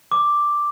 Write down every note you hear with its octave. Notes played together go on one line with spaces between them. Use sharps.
D6